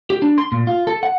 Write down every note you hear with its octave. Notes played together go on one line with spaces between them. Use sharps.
G4
D4
C6
A#2
F4
A4
F#5